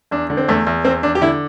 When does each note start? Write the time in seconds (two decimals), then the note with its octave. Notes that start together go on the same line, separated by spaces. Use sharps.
0.11 E2 D4
0.30 D3
0.37 C4
0.48 E2 A3
0.67 E2
0.85 E2 C4
1.03 E2 D4
1.15 G4
1.21 D3 E4